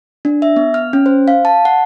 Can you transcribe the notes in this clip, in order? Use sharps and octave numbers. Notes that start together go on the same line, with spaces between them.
D4
E5
B3
F6
C#4
C5
F5
A5
F#5